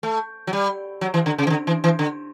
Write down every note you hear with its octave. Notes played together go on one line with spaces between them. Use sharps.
A3
F#3
G3
F#3
E3
D3
C#3
E3
D3
E3
E3
D3